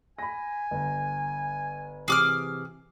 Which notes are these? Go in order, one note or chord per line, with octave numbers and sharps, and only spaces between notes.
G#5 B5 A#6
G1
C3 E3 G#4 D6 F6